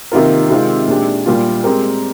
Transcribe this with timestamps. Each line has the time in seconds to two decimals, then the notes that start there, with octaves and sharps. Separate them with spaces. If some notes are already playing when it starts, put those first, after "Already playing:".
0.12 C3 D#3 A#3 F4 A#4
0.50 C3 D#3 G#3 C4 F4
0.88 A#2 G#3 D4 G4
1.26 A#2 G3 A#3 F4
1.64 G#3 C4 G4 A#4